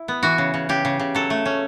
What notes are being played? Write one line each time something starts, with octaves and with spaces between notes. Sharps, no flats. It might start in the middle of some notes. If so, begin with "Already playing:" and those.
Already playing: E4
B3
E3 F#4
C#3
C#3
C#3 G4
C#3
C#3
F#3 A4
A3
C#4